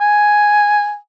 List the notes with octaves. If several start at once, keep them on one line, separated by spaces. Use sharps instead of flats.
G#5